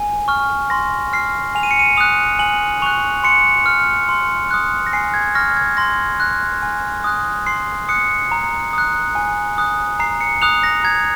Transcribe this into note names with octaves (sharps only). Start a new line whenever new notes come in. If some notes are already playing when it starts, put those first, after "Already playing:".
Already playing: G#5
C#6 F6
C6 A#6
F6 C7
G#5 F7
D#7
C#7
D#7
D#6 F#6 F7
G#5 F#7
C#6 F#6 F7
C6 C#7
F6
C6
D#6 F#6
A#6
G#5 C7
G#6
C#6 F6 A#6
G#6
C6 A#6
F#6
G#5
D#6 F#6
C6 C7
D#6 F#6 C#7
A#5
D#6 F#6
G#5
D#6 F#6
A#5 C7
C#7
D#6 F#6 F7
A#6
A#5 G#6